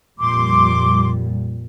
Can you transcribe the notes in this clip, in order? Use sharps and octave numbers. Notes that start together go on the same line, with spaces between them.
F2 A#2 G3 C6 D6